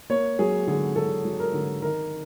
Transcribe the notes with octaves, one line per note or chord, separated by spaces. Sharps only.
A#3 C#5
F#3 G#4
D3 G#4
D3 A4
F#3
A#4
D3
D#3 A#4